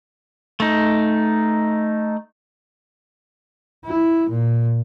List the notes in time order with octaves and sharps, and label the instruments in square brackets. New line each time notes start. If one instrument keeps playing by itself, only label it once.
[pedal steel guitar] A3 D#4
[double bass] E4
A#2